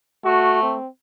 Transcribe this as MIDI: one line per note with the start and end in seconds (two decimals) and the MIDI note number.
0.25 0.75 57
0.25 0.61 66
0.62 0.88 60